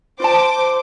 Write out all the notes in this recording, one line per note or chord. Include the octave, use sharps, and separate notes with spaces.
F4 C5 D5 A5 D6